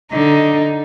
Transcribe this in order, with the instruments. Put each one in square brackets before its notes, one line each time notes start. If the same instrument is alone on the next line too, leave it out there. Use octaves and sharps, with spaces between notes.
[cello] D3 [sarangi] D#4